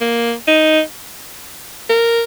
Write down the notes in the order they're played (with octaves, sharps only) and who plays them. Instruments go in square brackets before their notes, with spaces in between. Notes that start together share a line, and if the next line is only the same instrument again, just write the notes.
[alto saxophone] A#3
D#4
A#4